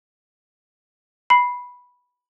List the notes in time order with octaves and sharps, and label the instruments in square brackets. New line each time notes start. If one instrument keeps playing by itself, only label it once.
[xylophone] B5 C7